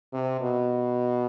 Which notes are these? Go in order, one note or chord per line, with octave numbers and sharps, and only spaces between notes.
C3
B2